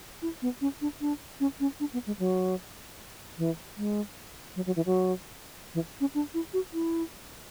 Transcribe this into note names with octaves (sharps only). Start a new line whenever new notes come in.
E4
B3
C#4
D4
D4
C#4
C#4
D4
B3
G#3
F#3
E3
G#3
F#3
F#3
E3
F#3
E3
C#4
D4
E4
F#4
E4